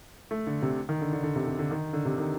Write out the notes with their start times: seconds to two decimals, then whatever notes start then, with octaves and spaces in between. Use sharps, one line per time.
0.31 A3
0.47 D3
0.62 C3
0.89 D#3
1.01 D3
1.13 D3
1.23 D3
1.36 C3
1.47 C3
1.59 D3
1.71 D#3
1.93 D3
2.05 C3
2.18 D#3